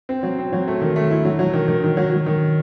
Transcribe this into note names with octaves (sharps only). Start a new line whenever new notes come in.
C4
F#3
C4
F#3
A3
D#3
A3
E4
F#3
F#3
D#3
D#3
D#3
F#3
F#3
D#3